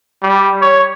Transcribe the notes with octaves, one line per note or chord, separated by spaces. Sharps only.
G3
C#5